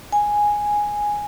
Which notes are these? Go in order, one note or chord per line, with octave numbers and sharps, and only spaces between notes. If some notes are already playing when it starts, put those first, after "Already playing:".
G#5